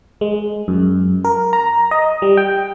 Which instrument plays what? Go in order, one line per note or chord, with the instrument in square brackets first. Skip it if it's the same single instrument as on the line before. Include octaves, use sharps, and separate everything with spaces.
[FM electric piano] G#3
F#2
A#4
A#5
D#5
G3
G5